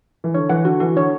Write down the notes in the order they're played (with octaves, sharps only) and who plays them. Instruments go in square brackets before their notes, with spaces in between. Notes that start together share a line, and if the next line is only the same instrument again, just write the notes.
[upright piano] E3
[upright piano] D3 [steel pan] C#5
[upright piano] E3 [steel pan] F#5
[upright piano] D3 [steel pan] F#4
[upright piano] E3 [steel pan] F#4
[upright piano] D3 [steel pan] C#5